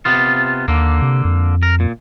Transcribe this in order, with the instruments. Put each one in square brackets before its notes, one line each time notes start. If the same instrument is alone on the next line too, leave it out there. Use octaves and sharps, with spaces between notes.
[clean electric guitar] C3 B3 F4
[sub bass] D#2 [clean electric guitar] D3 A#3
[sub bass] C3
F2
[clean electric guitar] A#4
A#2